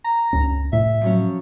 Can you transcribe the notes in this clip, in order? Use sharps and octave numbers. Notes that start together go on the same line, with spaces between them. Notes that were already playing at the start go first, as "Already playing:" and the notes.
A#5
C#2 F#2 C#4
A2 C3 E5
F3 F#3 C#4